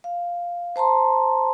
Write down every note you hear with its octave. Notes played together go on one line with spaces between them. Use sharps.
F5
C5 A5 A#5 C6